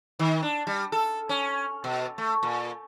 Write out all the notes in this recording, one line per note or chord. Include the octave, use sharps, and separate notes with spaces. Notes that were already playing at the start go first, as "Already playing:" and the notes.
D#3
D4
G3
A4
C#4
B2
A3
A#2